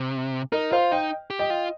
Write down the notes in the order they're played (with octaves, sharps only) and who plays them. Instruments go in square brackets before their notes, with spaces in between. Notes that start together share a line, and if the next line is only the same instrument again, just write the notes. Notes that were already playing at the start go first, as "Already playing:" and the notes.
Already playing: [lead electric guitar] C3
[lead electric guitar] D#4 [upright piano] A#4 D#5
[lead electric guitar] F4 [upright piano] C5 F5
[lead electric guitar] D#4 [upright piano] D#5 G5
[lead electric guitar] G4
[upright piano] D#5 G5
[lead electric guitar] F4